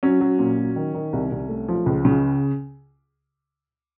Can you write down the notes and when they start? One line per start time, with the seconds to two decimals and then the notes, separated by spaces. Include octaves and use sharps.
0.03 F#3 C#4
0.21 F#3
0.39 A#2
0.58 F#3
0.76 D#3
0.94 D#3
1.13 C2
1.32 C2
1.49 A3
1.68 F3
1.86 C#2
2.05 C#3